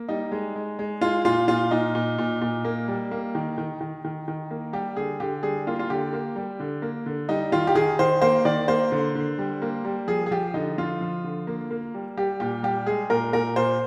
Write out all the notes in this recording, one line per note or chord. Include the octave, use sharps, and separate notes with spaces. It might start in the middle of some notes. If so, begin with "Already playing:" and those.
Already playing: A#3
G3 D#4
G#3
G#3
G#3
G#3 F4
A#2 F4
A#2 F4
A#2 D#4
A#2
A#2
A#2
A#3
G3
A#3
D#3
D#3
D#3
D#3
D#3
A#3
G3 G4
D3 G#4
D3 G4
G3 G#4
A#3 F4
F4
D3 G4
A#3
G3
D3
A#3
D3
G3 D#4
D#3 F4
G4
D#3 G#4
D#3 C5
A#3 C5
D#3 D5
A#3 C5
D3
D3
G3
A#3
G3
F3 G#4
G#4
F3 G4
D3 D#4
F3 F4
F3
D3
A#3
A#3
G3
G3 G4
A#2 G4
G3 G4
G#3 G#4
A#2 A#4
A#2 A#4
A#2 C5